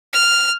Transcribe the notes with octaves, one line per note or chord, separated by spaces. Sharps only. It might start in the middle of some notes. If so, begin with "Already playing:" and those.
F6